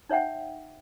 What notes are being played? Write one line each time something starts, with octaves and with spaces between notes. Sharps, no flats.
D#4 C#5 E5 F#5 G5